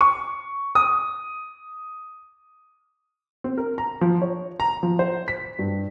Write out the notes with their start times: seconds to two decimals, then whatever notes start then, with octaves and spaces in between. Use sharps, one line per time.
0.01 C#6
0.75 D#6
3.44 C4
3.58 A#4
3.78 A#5
4.01 F3
4.22 C#5
4.60 A#5
4.83 F3
4.99 C5
5.28 B6
5.59 G2